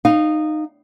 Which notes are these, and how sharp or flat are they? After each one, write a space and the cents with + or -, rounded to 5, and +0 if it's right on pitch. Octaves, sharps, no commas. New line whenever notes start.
D#4 -15 F5 +0